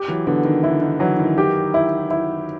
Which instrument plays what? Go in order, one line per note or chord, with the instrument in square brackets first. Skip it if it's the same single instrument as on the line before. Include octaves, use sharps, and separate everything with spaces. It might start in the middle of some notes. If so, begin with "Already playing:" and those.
Already playing: [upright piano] G4
[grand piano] E3 F#3
[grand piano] D3 E3 [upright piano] B3
[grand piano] D#3
[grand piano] D3 [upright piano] E4
[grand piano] D#3
[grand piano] D3 E3 [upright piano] F#3
[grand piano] D#3
[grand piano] D#3 [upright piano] G4
[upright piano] E4
E4